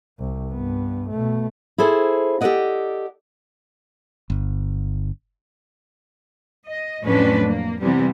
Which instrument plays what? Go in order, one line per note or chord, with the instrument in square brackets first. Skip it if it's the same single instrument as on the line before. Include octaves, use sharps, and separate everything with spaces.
[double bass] C2
G2 B3
B2 A3
[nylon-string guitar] E4 G#4 A4 C5
G4 A4 B4 D5 D#5 F#5
[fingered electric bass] G1
[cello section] D#5
F2 A2 F#3 C#4 D4 B4
A#3
C3 E3 G3 B3